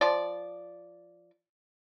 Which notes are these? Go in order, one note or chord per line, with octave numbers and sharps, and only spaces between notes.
F3 D5